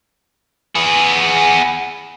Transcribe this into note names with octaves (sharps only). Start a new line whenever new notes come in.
B3 G#4